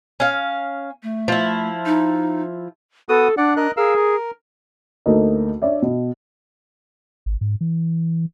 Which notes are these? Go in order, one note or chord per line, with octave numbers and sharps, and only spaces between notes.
C#4 F5
A3
F3 E4
D#4
B3 F#4 A4 D#6
D4 D5 F#5
A#4 D#5 F#6
G#4 A#4 F5 E6
A#4
D2 A3 A#3 D#4
D4 C#5 D5 E5
B2
G#1
G#2
E3